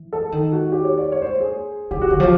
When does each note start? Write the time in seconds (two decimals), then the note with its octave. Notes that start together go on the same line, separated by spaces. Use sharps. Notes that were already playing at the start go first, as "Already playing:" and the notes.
Already playing: E3
0.13 A4
0.32 D#3
0.52 F#4
0.72 G4
0.85 C#5
0.98 D5
1.12 C#5
1.22 C5
1.41 G#4
1.91 C#3 G4
2.02 F#4
2.10 D3 G4
2.20 F3